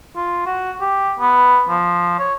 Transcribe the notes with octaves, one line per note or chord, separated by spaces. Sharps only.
F4
F#4
G4
B3
F3
C#5